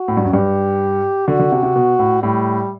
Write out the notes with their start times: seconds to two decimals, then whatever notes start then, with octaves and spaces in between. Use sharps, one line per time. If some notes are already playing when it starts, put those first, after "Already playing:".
Already playing: F#4
0.08 A2
0.17 G2
0.25 F#2
0.32 G2 G4
1.27 D3 F#4
1.40 D3
1.52 C3
1.63 C3
1.76 B2
1.99 A2
2.22 A2 G3